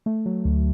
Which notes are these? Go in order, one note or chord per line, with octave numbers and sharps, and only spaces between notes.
A3
F#3
D2